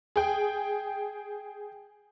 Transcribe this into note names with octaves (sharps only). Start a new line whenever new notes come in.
G#4 G5